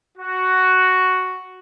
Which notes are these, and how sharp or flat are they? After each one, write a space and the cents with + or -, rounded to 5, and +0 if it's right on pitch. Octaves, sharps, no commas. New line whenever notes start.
F#4 +5